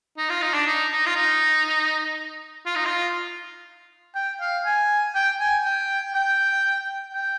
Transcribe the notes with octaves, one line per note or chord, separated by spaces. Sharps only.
D#4
F4
D#4
D4
D#4
D#4
F4
D#4
F4
D#4
F4
G5
F5
G#5
G5
G#5
G5
G5
G5